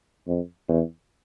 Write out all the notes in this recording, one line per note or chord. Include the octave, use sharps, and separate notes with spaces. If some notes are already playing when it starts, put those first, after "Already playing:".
F2
E2